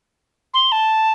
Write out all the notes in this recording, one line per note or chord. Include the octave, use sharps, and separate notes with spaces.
C6
A5